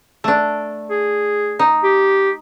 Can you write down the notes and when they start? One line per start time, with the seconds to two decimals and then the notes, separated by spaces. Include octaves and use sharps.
0.24 A3 D4
0.91 G#4
1.59 D#4
1.84 G4